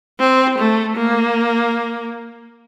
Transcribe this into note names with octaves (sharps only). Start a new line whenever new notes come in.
C4
A3
A#3